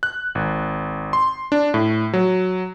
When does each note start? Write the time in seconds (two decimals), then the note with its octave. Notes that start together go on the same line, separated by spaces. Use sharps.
0.03 F#6
0.35 G#1
1.13 C6
1.52 D4
1.74 A2
2.13 F#3